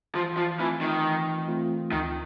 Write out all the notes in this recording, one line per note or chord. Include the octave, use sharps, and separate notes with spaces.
E3 F3
F3
E3 A3 C4 F4
D#3
E3
A3 C4 F4
D2 D#3